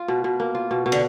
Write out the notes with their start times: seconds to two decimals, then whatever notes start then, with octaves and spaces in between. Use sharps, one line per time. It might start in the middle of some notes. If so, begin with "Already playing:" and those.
Already playing: F4
0.08 B2
0.24 B2
0.40 A#3
0.55 F4
0.71 B2
0.86 B2
0.92 D3